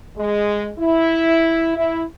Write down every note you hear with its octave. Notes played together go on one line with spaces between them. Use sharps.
G#3
E4
E4